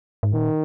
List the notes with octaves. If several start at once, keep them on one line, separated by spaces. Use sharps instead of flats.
G#2
A#2 D#3